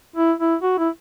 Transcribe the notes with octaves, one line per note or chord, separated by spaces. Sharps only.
E4
E4
F#4
E4